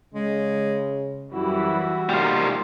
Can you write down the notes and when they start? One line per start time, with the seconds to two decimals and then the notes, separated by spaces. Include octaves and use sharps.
0.14 C#3 G#3
1.33 F#2 E3 G3 E4 F#4
2.09 C3 G3 A#3 D#4 F4